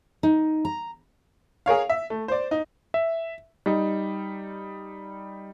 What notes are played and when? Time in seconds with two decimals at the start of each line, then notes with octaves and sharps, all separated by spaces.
0.23 D#4
0.65 A#5
1.66 G#4 A#4 C#5 F5
1.89 E5
2.10 A3
2.28 C5 D5
2.51 D#4
2.94 E5
3.66 G3 D#4